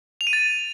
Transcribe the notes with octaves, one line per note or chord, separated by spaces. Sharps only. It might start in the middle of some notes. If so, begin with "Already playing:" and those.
F7
D#7
A6